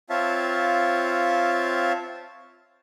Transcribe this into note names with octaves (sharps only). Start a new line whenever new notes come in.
C4 F4 C#5 E5 F5 A5